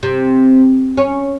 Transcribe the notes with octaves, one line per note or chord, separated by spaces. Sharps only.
C3
C#4